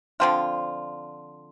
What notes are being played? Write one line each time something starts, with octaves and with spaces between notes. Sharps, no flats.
D3 F3 C4 F4